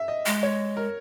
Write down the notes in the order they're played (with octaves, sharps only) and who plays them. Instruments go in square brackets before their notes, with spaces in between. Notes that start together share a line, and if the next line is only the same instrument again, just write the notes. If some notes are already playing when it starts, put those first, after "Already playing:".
Already playing: [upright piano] E5
D#5
[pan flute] G#3
[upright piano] C#5
A#4